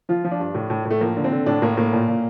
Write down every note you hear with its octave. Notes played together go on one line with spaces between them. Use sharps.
F3 F4
F3
D4
G2
A2
A2
A2
A3
F3 A#3
D3
C4
D3
A2 D4
A2 A#3
A2 A#3
A#2
A#2